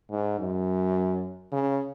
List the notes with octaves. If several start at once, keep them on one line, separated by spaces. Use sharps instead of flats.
G#2
F#2
C#3